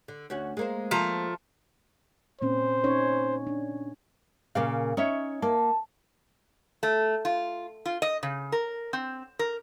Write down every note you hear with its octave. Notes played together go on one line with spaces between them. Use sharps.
D3
D2 C#4 F#4
G#3 A#3 C5
F3 A3 A#5
A#2 C4 C#4 C5
C#4 D#4 C#5
D4
A#2 C#3 A#3 F5
C#4 D#4 C#5 E5
A#3 A5
A3
F4
F4
D#5
C#3
A#4
C4
A#4